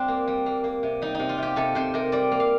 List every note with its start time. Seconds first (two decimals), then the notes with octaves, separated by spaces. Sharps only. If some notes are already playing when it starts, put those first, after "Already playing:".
Already playing: G3 C4 D4 F4
0.08 A#3
0.27 G3
0.46 A#3
0.64 A#3
0.83 C3
1.02 G3 D#4
1.15 C3 D#4
1.29 F4
1.38 C3 G4
1.56 C3 A4
1.75 C3 C5
1.94 C3 A#4
2.12 G3 D5
2.32 A#3
2.40 F5